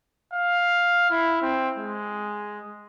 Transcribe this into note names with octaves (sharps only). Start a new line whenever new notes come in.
F5
E4
C4
G#3